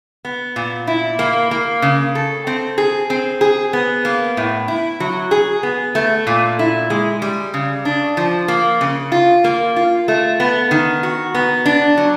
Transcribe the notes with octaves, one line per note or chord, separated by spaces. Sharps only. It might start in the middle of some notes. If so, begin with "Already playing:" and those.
B3
A#2
E4
A#3
A#3
C#3
A4
C4
G#4
C4
G#4
B3
A#3
A2
E4
F#3
G#4
B3
A3
A#2
E4
G#3
G3
C#3
D4
F3
A#3
C#3
F4
A#3
F4
A3
B3
D#3
F#4
B3
D4
F#3